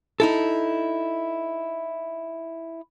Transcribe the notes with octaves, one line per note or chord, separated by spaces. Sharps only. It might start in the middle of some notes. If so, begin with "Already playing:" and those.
D#4 E4 A4